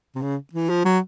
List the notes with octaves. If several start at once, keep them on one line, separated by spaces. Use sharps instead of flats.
C3
C#3
E3
F3
F#3